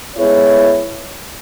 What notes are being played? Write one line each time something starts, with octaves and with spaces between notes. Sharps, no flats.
G#3 B3 E4 G#4 C#5